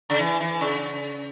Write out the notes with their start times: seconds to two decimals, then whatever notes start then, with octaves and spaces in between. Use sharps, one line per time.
0.10 C#3
0.19 E3
0.40 E3
0.61 C#3